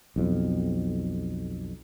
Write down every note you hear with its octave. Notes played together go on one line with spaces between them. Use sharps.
B1 F2